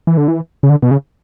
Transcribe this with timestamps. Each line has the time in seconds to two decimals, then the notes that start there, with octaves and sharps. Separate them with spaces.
0.07 E3
0.17 D3
0.28 E3
0.63 C#3
0.70 D3
0.82 B2
0.91 C#3